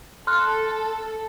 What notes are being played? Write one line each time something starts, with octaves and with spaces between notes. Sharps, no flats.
A4 C6 F6 F#6